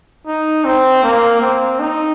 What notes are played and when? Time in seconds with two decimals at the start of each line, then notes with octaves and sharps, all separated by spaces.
0.27 D#4
0.65 C4
1.04 A#3
1.41 C4
1.79 D#4